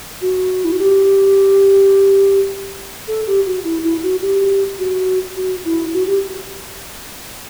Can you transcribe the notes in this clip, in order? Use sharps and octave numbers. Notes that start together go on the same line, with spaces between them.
F#4
E4
F#4
G4
A4
G4
F#4
E4
E4
F#4
G4
F#4
F#4
E4
F#4
G4